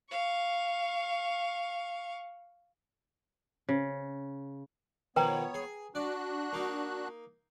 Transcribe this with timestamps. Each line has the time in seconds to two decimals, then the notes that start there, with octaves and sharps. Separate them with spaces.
0.11 F5 C#6
3.69 C#3
5.16 B2 D#3 F3 B3 B4 C#5 G5 A#5
5.54 G#4
5.95 D4 F#4 D5 F#6
6.53 A#3 D#4